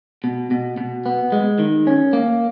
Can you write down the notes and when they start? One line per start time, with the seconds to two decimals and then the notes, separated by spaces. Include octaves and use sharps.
0.24 B2
0.51 B2
0.77 B2
1.06 B3
1.32 G#3
1.59 D#3
1.87 C#4
2.13 A#3